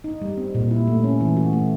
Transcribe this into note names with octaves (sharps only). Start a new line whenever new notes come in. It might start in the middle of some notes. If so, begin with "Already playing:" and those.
D#4
G3
C4
A#2
E4
A3
C#4
E3
F#4
A3